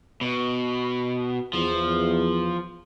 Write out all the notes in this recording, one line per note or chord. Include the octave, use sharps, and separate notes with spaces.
B2
E2 F3